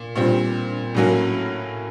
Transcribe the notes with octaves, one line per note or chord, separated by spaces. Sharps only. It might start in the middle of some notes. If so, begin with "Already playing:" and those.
Already playing: A#2
A#2 G3 C4
A2 F#3 A#3 C#4